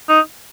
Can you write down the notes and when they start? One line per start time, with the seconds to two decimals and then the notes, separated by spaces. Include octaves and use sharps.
0.09 D#4